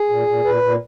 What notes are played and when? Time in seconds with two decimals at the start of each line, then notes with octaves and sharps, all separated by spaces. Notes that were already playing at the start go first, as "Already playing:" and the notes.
Already playing: G#4
0.09 A#2
0.27 A#2
0.44 A#2 B4
0.62 A#2